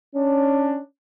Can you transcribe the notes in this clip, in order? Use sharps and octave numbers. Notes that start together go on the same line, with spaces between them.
C#4 D4